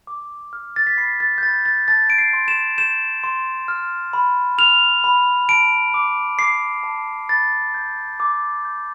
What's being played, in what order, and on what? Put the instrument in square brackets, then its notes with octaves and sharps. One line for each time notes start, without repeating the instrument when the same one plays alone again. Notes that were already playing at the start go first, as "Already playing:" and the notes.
[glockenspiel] D6
F6
A6
B6
B5 C7
A6
G6
B5 A6
A6
A5 A6
D7
C7
C6
E7
G6 E7
C6
F6
B5
F6 F7
B5
A5 D7
D6
D6 C7
A5
B5 A6
G6
D6
G6